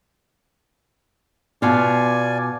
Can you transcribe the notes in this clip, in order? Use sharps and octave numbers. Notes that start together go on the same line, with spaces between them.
B2 F4 D5 G#5